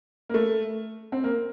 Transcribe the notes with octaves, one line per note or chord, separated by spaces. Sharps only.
A#3
A3
C4
A#3